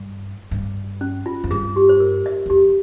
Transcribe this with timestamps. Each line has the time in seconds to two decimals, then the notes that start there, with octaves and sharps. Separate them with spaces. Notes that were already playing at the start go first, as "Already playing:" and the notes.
Already playing: G2
0.51 G2
1.01 C#4
1.26 F4
1.44 F2
1.51 G2 G#4
1.76 G4
1.89 C5
2.00 A#4
2.26 E5
2.46 G2
2.50 F2 G4